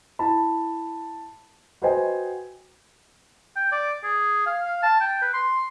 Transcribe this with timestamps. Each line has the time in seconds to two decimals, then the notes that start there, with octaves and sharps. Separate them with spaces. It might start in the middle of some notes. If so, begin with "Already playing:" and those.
0.19 E4 A5 B5
1.82 F#4 B4 C5 D#5 G5 G#5
3.56 G5
3.72 D5
4.04 G#4
4.46 F5
4.64 F5
4.83 A5
5.01 G5
5.22 B4
5.34 C6